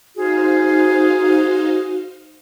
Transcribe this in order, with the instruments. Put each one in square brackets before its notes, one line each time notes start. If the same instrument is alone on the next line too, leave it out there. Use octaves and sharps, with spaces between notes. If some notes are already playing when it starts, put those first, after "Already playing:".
[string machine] D#4 C5 F5 [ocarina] F#4 [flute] G#4